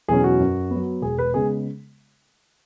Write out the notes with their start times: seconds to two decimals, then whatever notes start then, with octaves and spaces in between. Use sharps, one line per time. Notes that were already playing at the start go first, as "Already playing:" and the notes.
0.08 E2 B2 F#3 C#4 G#4
0.24 F#4
0.40 F#2
0.70 B3
0.76 F#3
1.02 E1 G#4
1.18 B4
1.34 C#3 G#3 B3 G#4